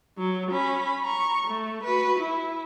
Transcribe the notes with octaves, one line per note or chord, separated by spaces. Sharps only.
F#3
C#4 B5
A#5 C#6
A3
F#4 B4
E4